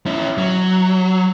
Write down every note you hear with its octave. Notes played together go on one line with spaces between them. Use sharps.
C#4 E4
F#3